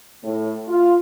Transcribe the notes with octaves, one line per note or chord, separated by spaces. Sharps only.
A2
F4